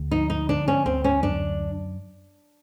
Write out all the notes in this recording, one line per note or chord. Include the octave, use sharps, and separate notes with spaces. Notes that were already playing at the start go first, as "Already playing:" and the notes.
Already playing: D2
F3 D#4
D#4
D3 D4
C#4
D2 C4
C#4
F#2 D4